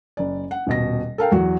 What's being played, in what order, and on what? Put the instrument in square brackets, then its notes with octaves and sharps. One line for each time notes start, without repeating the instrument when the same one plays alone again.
[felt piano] F#1 D5
F#5
D#1 B2 A#6
A4 A#4 F5 G5
E2 F#3 F#4